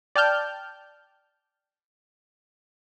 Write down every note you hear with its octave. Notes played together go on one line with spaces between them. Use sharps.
D5 G5 A5 F6 G6